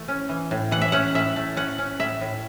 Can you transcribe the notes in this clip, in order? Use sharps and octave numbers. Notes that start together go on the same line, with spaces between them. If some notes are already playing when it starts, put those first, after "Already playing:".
Already playing: E3 A3
C#4
E3
A2
E3 F#5
E5
C#4 F#5
A2 E5
A3
C#4 F#5
C#4
A2 E5
A2